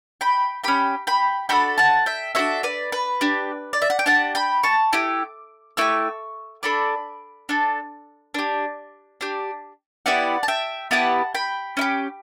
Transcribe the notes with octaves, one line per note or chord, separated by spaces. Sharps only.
G5 B5
C#4 G4 G5 B5
G5 B5
D4 F#4 A4 G5 B5
F#5 A5
E5 G5
D4 F#4 A4 C#5 E5
B4 D5
B4
D4 G4
D5
E5
F#5
G5
D4 G4 F#5 A5
G5 B5
A5 C#6
A3 E4 G4 D6
A3 E4 G4 C#6 E6
D4 A4 B5 D6
D4 A4
D4 G4
D4 G4
B3 E4 G4 D5 F#5
A5
E5 G5
B3 E4 G4 F#5 A5
G5 B5
C#4 E4 G4